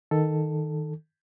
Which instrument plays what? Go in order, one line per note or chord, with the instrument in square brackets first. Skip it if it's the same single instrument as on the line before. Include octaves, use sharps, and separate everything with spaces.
[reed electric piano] D#3 A4